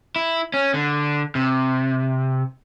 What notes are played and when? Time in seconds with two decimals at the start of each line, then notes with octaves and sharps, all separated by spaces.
0.16 E4
0.54 C#4
0.74 D3
1.35 C3